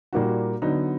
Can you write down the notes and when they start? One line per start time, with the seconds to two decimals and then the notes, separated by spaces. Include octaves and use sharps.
0.13 A#2 G3 A#3 D#4 F#4
0.62 D3 F#3 B3 D#4